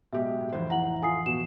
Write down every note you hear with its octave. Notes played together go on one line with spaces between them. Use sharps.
B1 G#3 G4 E5
A2
F1 E3 F3 C5
A2 E4 F#5 A#5 F#7
F4 G#5 D#6 C7
B2 E7